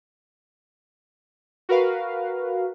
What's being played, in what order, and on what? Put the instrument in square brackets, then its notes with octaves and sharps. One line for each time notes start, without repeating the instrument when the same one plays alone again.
[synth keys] F#4 A#4 B4 F5